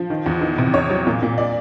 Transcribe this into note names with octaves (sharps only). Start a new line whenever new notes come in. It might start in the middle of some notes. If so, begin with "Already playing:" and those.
Already playing: F3
D#3
E2
D#3
C3
E2 C#5
F#3
A#2
A#2
D5